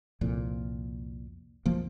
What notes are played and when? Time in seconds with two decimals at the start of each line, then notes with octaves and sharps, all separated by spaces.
0.21 C2 F2 A#2
1.66 B1 F2 F3 A#3